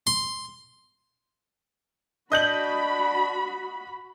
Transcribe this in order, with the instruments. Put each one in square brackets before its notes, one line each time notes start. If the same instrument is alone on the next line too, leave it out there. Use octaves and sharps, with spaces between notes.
[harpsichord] C6
[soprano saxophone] D4 [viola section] F#4 B5 [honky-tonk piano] D#5 G6 F#7